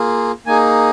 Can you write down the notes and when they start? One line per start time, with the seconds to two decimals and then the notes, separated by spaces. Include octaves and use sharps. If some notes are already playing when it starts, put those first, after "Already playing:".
Already playing: A#3 F4 G#4
0.46 A#3 D#4 G#4 G#5